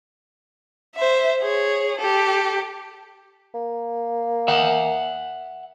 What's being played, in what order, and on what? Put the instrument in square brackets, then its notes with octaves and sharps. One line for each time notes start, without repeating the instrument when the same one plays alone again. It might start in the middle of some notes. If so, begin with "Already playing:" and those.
[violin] C5 E5
G#4 C#5
G4 A4
[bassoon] A#3
[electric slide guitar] E5 F#5